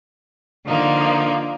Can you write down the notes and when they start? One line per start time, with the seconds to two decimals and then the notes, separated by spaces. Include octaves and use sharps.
0.66 D3 F3 A#3 D#4